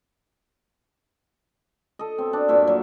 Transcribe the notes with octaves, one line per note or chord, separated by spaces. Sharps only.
A4 D#5
B2 C4
D4
G2 A#2 C#5 E5
F#3